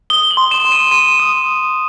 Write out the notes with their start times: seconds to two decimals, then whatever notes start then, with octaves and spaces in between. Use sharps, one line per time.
0.10 D#6 G7
0.31 F#7
0.37 C6
0.51 E7
0.65 C6
0.72 D#7
0.91 C6 D#7
1.19 D#6